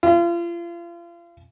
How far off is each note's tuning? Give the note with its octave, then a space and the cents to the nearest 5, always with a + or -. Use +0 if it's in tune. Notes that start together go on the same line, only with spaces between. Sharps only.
F4 -35